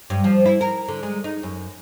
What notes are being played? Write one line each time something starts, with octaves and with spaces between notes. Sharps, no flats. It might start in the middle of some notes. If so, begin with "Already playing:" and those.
G2
F3
E4
A#4
D3
G#3
D#4
F#2